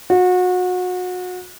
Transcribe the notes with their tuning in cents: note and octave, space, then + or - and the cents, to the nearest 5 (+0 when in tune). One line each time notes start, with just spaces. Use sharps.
F#4 -30